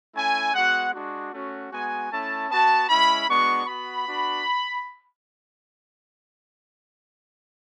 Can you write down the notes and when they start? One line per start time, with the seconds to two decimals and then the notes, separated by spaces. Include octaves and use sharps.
0.16 A3 C#4 E4 G#5
0.54 G#3 B3 F#4 F#5
0.93 G#3 D4 F#4
1.33 A3 C#4 F#4
1.71 G#3 B3 F#4 G#5
2.11 A3 C#4 E4 A5
2.50 B3 F#4 A5
2.89 G#3 C#4 E4 B5
3.28 G#3 B3 D4 F#4 C#6
3.67 B3 F#4 B5
4.06 B3 D4 F#4